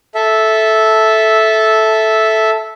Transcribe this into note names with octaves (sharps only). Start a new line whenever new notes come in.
A4 E5